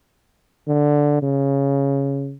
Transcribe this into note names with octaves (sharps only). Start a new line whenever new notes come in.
D3
C#3